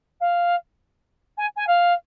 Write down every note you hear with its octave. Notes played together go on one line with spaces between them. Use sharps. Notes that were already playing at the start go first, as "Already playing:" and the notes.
F5
G#5
G#5
F5